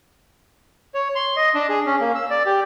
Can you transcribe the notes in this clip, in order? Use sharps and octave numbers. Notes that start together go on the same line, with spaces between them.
C#5
C6
D#5
D4
G#4
C#4
A#3
E6
D5
G4